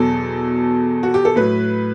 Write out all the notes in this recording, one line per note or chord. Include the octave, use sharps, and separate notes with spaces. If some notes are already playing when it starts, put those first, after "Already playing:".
Already playing: E2 B2 F#3 A4
F#4
G4
A4
A2 F#3 B4